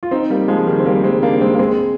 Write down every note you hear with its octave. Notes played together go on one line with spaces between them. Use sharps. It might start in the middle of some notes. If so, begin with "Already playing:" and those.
F4
C4 D#4
G3 A#3
F3 G#3
D#3 G3
C4
G3 A#3
G#3 C4
A#3 D4
G#3 C4
A#3
G#3 C4